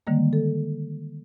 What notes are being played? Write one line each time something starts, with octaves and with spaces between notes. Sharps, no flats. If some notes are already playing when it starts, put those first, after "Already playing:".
D3 D#3 G3 G#3 A#3
A4